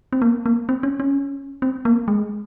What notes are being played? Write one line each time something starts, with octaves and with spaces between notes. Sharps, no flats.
C4
A#3
A#3
C4
C#4
C#4
C4
A#3
G#3